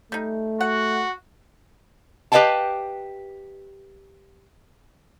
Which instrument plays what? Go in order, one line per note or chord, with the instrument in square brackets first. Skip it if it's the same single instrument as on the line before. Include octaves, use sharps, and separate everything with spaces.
[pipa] G3 D#4 [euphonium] A3
[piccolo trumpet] F#4 [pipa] F#5
[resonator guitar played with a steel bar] G4 B4 D#5 F5 G5 A5